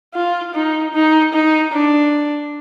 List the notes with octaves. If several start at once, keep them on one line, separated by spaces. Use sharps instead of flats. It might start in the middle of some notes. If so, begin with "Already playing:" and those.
F4
D#4
D#4
D#4
D4